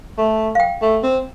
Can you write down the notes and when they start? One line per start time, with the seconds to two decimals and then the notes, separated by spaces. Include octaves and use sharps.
0.18 A3
0.55 F5
0.60 G5
0.82 A3
1.03 C4